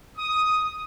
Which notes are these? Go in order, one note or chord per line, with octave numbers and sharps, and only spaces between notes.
D#6